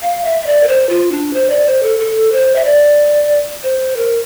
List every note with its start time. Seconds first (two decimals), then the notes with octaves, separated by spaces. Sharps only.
0.02 F5
0.25 E5
0.41 E5
0.47 D5
0.63 A#4
0.68 C5
0.89 F4
1.12 D4
1.34 C5
1.50 D5
1.66 C5
1.83 A4
1.99 A4
2.32 C5
2.56 E5
2.65 D5
3.63 C5
3.96 A#4